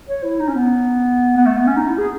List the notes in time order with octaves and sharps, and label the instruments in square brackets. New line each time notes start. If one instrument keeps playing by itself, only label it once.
[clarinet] C#5
E4
D#4
C#4
B3
B3
A3
B3
C#4
D#4
E4
G#4